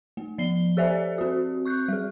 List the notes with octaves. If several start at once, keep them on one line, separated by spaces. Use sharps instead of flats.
A3
F3 C7 G7
G4 A4 C5 D5 E5 G#5
C4 F#4
C#6 F#6 G6
G3 G#4